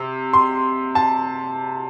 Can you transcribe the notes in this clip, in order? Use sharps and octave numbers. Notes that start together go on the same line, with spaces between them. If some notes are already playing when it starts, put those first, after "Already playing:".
Already playing: C3
C6
A5